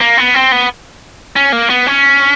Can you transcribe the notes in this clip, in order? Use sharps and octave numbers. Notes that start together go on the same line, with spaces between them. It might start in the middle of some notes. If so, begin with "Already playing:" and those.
A#3
B3
C4
B3
C#4
A#3
B3
C#4